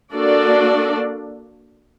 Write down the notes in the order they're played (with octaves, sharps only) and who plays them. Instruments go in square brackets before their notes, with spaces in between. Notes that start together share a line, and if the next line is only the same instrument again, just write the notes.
[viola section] A#3 D4 F#4 A4 D5